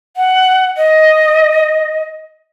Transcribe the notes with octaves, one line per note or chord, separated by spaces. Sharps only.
F#5
D#5